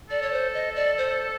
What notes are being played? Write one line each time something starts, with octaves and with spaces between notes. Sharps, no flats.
A4 D5
C#5
C5
D#5
D5
C5